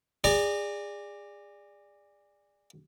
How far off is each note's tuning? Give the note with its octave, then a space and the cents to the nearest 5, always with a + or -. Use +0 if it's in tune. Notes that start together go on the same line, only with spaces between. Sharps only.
G#4 -25 D5 +5 A#5 -25